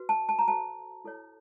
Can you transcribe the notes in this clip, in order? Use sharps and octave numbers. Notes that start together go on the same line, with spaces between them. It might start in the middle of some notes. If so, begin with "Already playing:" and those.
Already playing: F#4 B4
A5
A5
A#5
F#4 A4 C5 A5
E4 A4 C#5